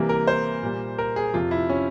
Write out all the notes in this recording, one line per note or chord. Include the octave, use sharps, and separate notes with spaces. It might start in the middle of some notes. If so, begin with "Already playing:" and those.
Already playing: C3 E3 G3 A#3
A#4
C5
A#2 G3 A#3
A#4
G#4
F2 C3 F3 F4
E4
C#4